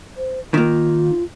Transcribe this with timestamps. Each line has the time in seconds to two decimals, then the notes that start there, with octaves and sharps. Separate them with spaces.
0.17 C5
0.54 D#3 A#3 F4